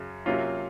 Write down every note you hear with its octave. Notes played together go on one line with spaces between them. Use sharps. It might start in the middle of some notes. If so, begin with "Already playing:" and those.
Already playing: F#2 C#3 F#3
C3 F#3 A#3 C#4 F4